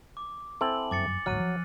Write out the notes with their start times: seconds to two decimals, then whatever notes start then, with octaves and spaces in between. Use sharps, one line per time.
0.17 D6
0.61 C4 E4 A4 G#5 F#7
0.91 G1 F#2 D6 A6 C#7
1.26 A1 D2 G#2 F#3 F6 F#6 D#7
1.40 F3